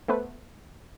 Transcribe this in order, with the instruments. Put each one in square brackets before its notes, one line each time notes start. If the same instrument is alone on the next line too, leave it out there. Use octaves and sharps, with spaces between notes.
[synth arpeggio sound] A3 B3 B4 C5